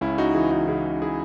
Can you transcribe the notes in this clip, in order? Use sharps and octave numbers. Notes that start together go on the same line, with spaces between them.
C#2 C#4 E4
D#4 F#4
E3 E4 G#4
D#4 F#4
C#3 E4 G#4
E4 G#4